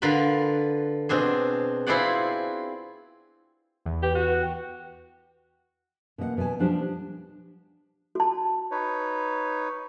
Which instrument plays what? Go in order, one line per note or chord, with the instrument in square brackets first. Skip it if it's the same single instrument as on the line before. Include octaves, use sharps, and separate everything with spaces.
[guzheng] D3 F4 A#4 B4 B5
B2 C4 D4 G#4
C4 E4 F4 G#4 D5 F#5
[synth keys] E2
[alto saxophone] G4 [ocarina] B4
[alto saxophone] F#4
[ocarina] G5
[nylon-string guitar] B2 E3 A#3 D#5 F#5
B2 B3 D#5 G#5 A5
F3 G3 D4 G4 C5
[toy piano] F#4 A5
[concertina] D#4 B4 C#5